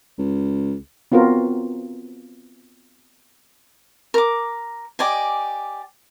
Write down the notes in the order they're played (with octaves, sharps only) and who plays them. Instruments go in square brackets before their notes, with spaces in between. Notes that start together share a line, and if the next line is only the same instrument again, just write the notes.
[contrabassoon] C#2
[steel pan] B3 C4 F4 F#4 A#4
[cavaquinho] A#4 D6
G4 D5 D#5 G#5